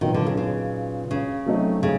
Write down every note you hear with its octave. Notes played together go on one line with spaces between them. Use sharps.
A#2 D#3 F#3 B3 D#4
D3
C#3
C#3
C#3
F#3 A3 C4 D#4
C#3